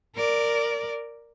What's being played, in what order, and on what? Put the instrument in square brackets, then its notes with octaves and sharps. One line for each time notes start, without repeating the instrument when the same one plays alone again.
[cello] A#4 D5